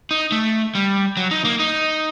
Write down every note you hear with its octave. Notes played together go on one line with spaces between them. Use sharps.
D#4
A3
G3
F#3
D#4
A#3
D#4